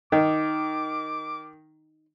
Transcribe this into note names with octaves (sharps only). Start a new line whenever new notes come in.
D#3 D#4 D6